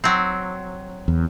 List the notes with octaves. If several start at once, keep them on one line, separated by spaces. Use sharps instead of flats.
F#3 C4
E2